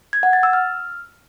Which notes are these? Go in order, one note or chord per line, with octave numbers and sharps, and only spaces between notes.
G#6
F#5
A6
E6
F6